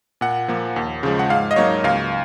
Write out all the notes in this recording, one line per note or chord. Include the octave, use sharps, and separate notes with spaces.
A#2 F#5
F3 A#3
D#2
C#3 F3 G#3
F#5
G#2 F5
D#5
F#3 A#3 D#4 C#5
C#2 F5